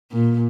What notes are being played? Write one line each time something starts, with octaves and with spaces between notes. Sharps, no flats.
A#2